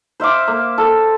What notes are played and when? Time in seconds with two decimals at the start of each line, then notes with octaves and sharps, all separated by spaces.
0.20 C5 E5 F5 D6
0.47 A#3
0.78 A4